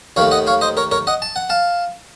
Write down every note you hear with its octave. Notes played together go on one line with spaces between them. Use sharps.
D#2 D#3 A3 C#5 F5
D#5 F#5
C#5 F5
C5 D#5
A#4 C#5
A#4 C#5
D#5 F#5
A5
F#5
F5 A5